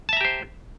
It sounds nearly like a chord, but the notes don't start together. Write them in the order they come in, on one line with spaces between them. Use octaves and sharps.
A5 E5 A#5 G4 C5